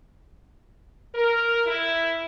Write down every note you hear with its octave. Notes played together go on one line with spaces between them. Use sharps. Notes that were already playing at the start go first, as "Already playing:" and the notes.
A#4
E4